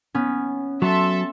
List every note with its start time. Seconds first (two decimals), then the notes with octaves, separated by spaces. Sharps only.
0.14 B3 C#4
0.82 F#3 A4 E5 A5 C6